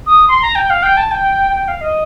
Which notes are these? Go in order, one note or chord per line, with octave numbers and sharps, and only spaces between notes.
D#6
C6
A#5
G5
F5
G5
A5
G5
G5
F5
D#5